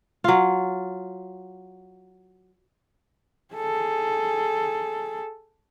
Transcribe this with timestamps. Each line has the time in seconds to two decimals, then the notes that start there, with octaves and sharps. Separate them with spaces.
0.24 F#3 F4
3.54 G#4 A4